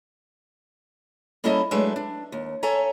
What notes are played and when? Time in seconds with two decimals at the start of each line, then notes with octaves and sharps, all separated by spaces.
1.44 G3 A#3 C#4 E4 A4 D#5
1.71 F#3 G#3 A3 D4 B4 E5
1.96 D4
2.32 D#2
2.63 A4 C#5 E5 G#5 A#5